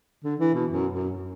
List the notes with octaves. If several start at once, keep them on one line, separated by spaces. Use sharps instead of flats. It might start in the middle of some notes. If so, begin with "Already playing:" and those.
D3
E3
B2
F#2
F#2